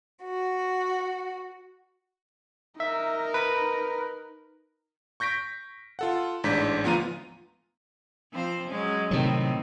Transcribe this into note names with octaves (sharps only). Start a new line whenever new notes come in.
F#4
D#4 A#4 E5
B4
C#6 G6 A#6 B6 D7
F4 A4 F#5
A1 G#2 D4 G6 B6
D2 F3 B3 F4 A#5 D#7
F3 C4 C5
F#3 G#3 C#4
A2 C3 D#3 F#3 C4